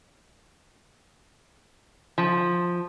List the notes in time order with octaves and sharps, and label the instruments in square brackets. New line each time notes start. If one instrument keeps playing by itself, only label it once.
[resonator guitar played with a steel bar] F3